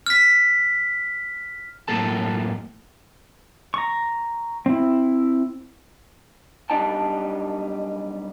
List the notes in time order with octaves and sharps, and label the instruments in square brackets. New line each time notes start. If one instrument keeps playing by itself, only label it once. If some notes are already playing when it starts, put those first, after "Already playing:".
[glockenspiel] F6 B6
[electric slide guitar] F#2 A2 A#3 A4 A5
[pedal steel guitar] A#5 C#6
C4 E4
[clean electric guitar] B1 G3 D4 D#4 G5 A5